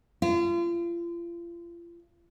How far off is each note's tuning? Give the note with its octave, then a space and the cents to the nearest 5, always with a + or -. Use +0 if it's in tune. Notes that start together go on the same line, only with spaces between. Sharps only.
F4 -35